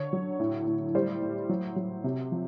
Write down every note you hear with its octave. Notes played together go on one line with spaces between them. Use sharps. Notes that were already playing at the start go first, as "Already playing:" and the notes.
Already playing: D3 C#5
F#3
A2
A2
G3 C5
A2
F#3
F#3
C3
F3